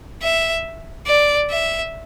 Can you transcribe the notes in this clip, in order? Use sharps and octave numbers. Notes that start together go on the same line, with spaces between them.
E5
D5
E5